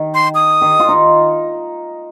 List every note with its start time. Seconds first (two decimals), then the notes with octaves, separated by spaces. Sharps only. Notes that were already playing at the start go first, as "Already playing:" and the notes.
Already playing: D#3
0.14 C6
0.35 D#6
0.62 D#3
0.80 F4
0.89 D#4